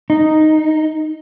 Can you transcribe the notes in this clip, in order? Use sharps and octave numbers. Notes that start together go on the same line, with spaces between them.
D#4